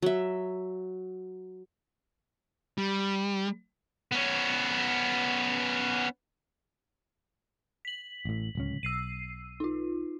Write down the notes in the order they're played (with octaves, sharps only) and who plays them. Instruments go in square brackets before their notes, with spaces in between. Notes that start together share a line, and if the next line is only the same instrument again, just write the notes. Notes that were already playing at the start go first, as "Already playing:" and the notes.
[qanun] F#3 E5
[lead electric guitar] G3
[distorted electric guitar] B3 C#4
[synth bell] B6 F#7
[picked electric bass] A1 A2
D1 C#2 C#4
[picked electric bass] B1 [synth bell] E6 C7 D#7
[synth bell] D#4 F4